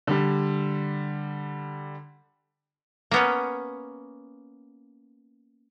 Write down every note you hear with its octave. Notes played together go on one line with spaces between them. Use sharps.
D3 G3
A#3 B3 C#4